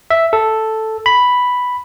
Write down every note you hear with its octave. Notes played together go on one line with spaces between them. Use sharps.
E5
A4
B5